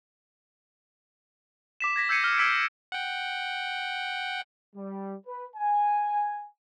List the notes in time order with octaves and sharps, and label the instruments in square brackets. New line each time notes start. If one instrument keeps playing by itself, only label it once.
[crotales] D6 B6 E7
G#6 A#6 B6
E6 G6 G#6 C7 C#7 D#7
F6
E6 G#6 B6 C#7 D7
[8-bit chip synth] F#5 G5
[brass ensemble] G3
B4
G#5